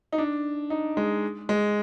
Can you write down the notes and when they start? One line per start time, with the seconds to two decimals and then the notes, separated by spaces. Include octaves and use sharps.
0.12 D#4
0.18 D4
0.70 D#4
0.97 G#3
1.49 G#3